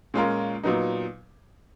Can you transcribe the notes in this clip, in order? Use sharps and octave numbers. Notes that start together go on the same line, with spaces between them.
A#2 G#3 C#4 F4 A#4
A#2 F#3 B3 D#4